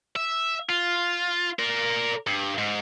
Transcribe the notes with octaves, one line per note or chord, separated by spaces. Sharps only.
E5
F4
A#4 D5
G2
G#2